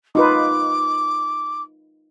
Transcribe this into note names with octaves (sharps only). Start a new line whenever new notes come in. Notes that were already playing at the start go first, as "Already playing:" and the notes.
D#4 F4 B4 D6